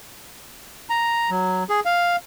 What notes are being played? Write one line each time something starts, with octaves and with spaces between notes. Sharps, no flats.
A#5
F#3
G#4
F5